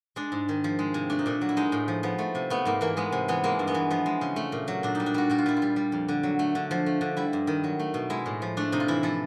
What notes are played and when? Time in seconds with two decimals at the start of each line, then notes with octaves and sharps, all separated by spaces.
0.16 G#3 D4
0.32 G#2
0.49 D#3
0.64 F3
0.79 G#3
0.94 C3
1.10 A3 D4
1.19 D#4
1.26 A#2 D4
1.41 F#3
1.49 E4
1.57 G#3 D#4
1.72 A2
1.88 F3
2.03 F3 B3
2.19 A3
2.35 C3
2.50 A3 B3
2.65 G#2 A#3
2.81 E3 A#3
2.97 G#3 B3
3.12 C3
3.28 E3 B3
3.44 G#3 A#3
3.59 G2
3.67 B3
3.74 E3
3.91 F3 B3
4.06 G#3
4.21 C#3
4.36 A3
4.52 A#2
4.68 F#3
4.83 A#2 D4
4.95 G3 D#4
5.06 D4
5.14 G3 F#4
5.30 A#2 F#4
5.38 F4
5.46 G3 E4
5.56 F4
5.62 G3
5.76 G3
5.92 F2
6.09 D3
6.23 F#3
6.39 A3
6.55 D3
6.71 F3
6.86 A3
7.01 D3
7.17 G3 E4
7.33 G2
7.47 D#3
7.64 F#3
7.80 A3
7.94 B2
8.10 G#3 E4
8.26 A2
8.42 F3
8.57 A3 D4
8.72 C3 D#4
8.80 F4
8.88 E3 E4
9.03 F3 A4